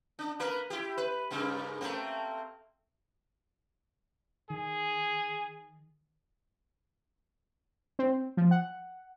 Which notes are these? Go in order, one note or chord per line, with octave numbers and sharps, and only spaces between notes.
D4
A#3 A#4 B4
E4 G4
B4
G2 C#3 A#3
A3 A#3 C4
D#3 G#4
C4
F3
F#5